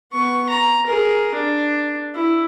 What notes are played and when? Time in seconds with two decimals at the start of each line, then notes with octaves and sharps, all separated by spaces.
0.12 B3 C#6
0.50 A#5
0.87 G#4 A#4
1.35 D4
2.15 E4